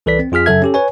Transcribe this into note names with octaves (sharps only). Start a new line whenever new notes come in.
C2 E3 A4 B4 D5 B6
C4
F2 F4 G#4 F6 B6
F#2 C#3 F#3 A4 E5 G#6
C#4 G4 A4
B4 C#5 G#5